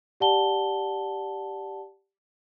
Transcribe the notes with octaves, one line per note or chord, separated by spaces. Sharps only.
G4 D5 F#5 A5 G7